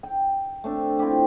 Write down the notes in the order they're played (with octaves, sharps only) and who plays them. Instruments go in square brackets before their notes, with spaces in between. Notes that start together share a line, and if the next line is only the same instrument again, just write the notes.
[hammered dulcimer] G5
A3 C4 D4
C4 E4 F4 G4